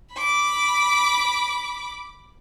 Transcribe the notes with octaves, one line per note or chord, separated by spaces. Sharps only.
B5 D6